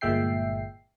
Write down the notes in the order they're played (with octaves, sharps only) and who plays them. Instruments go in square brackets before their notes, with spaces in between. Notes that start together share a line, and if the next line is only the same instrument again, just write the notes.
[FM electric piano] G1 A#2 G#3 E5 G5 C7